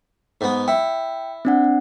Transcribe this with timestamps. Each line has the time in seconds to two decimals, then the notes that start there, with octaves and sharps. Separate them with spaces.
0.41 G#2 B3
0.68 E4 G5
1.45 C4 D4 F#5